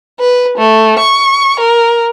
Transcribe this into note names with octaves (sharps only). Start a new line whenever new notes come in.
B4
A3
C#6
A#4